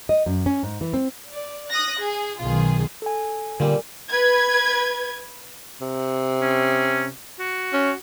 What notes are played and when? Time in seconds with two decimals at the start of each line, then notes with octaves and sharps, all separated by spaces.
0.09 D#5
0.26 F#2
0.46 C#4
0.63 G#2
0.81 E3
0.94 C4
1.31 D5
1.71 D#6 F#6 A#6
2.02 G#4
2.41 B1 D#3 F4 G#4
3.02 A4 G#5
3.60 A#2 D3 G3
4.10 B4 G#6
5.81 C3
6.41 C#4
7.40 F#4
7.73 C#4